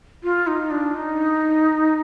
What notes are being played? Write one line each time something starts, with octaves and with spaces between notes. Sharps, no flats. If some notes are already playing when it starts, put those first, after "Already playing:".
F4
D#4
D4
D#4